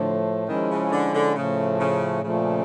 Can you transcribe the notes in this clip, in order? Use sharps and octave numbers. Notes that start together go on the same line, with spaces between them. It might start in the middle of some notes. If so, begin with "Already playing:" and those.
Already playing: A2 D3 F3 A3
D#3 F3 G#3 C#4 E4
C#3
D3
D3
A2 C#3 F3 A3
C#3
A#2 C#3 F3 A3